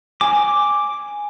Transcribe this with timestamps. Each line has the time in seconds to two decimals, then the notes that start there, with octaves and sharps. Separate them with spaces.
0.21 G#5 D6